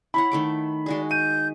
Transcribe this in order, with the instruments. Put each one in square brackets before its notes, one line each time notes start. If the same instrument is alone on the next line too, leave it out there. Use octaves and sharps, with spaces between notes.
[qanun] E4 C#5 F#5 [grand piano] B5
[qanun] D#3 A3 D6
[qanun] G#3 F#4 G#4 [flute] D5
[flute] G6 [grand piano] D#7